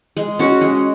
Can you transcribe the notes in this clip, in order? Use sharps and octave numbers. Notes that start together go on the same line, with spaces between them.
G#3
C#4 F#4
G#3